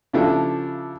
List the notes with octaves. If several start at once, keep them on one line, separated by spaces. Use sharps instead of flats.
C#3 F3 D4 E4 G4 A4